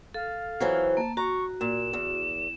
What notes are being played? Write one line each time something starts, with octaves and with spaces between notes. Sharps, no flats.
A4 F5
F2 E3 F#3 C5
A#3 A5
F#4 A#5 C#6
A#2 E7
E2